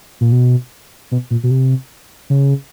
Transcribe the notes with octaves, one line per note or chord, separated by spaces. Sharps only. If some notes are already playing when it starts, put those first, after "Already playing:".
A#2
B2
B2
A#2
B2
C3
C#3